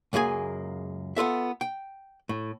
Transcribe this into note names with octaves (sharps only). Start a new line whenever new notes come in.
C#2 F#2 A#3 G#4 G#5
B3 F4 A4 E5
G5
A2